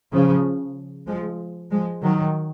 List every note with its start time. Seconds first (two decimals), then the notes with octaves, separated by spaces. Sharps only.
0.12 C#3 F3
1.07 F3 G#3
1.71 F3 G#3
2.02 D#3 F#3